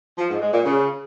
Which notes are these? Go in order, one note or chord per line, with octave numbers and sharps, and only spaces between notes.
F3
G#2
G#3
A#2
C#3